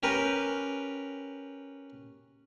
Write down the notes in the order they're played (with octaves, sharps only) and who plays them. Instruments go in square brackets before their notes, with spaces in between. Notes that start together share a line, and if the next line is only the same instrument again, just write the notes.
[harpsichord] C#4 G4 A#4 B4